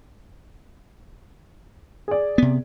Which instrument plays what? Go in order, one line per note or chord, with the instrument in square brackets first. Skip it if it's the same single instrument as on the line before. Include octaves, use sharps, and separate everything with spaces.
[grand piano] G#4 D5
[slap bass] C3 B3